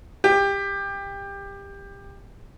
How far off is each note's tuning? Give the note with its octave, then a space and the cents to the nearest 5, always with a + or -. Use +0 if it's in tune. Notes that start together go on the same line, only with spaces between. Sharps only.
G4 +20